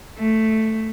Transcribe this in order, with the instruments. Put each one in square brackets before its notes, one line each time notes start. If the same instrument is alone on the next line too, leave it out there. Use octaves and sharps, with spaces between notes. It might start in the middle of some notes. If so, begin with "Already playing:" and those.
[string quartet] A3